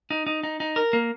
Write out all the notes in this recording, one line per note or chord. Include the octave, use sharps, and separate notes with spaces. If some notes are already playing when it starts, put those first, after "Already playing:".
D#4
D#4
D#4
D#4
A#4
A#3